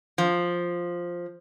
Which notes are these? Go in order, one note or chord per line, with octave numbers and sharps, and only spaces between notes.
F3